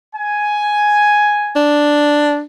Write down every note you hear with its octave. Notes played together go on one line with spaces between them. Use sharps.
G#5
D4